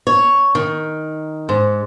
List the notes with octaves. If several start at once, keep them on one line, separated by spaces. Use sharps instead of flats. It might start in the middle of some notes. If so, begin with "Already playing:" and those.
C#5
D#3
G#2